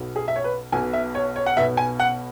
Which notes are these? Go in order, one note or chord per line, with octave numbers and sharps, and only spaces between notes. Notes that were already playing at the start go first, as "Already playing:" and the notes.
Already playing: B1 B2 B3
G#4
E5
C#5
B4
B1 B2 B3 G#5
E5
C#5
C#5
F#5
B1 B2 B3 E5
G#5
F#5